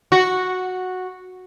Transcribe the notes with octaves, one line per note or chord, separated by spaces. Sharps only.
F#4